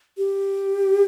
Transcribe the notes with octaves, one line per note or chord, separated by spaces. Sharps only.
G4